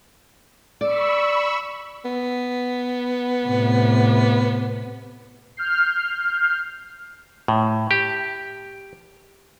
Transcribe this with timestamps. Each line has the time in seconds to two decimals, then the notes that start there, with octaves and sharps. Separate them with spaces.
0.81 D5 B5 C#6 E6
2.05 B3
3.45 A2 C3
5.57 F6 G6 C7
7.48 A2
7.91 G4